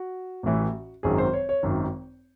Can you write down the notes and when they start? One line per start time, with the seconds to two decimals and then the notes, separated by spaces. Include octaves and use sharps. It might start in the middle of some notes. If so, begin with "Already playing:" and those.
Already playing: F#4
0.43 A1 A2 E3
1.03 G#1 F#2 D#3 F#3 G#4
1.18 C5
1.33 C#5
1.49 C#5
1.63 G#1 F#2 D#3